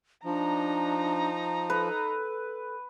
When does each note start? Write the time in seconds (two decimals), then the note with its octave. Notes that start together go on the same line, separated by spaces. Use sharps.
0.25 F3 D4 D#4 A#5
1.70 A4 B4